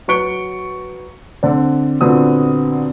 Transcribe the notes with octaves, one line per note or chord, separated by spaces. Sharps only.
F#3 B4 C#6 C#7 D7 G7
D3 C4 D5
A#2 D3 B3 C4 F#4 D#6